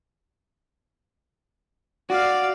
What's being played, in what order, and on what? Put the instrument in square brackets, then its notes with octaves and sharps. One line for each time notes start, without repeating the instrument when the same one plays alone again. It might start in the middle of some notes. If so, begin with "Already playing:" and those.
[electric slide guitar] F#4 [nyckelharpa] D5 F5